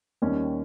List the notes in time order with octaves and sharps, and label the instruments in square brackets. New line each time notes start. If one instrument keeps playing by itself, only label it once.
[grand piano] D#2 D#3 G3 C#4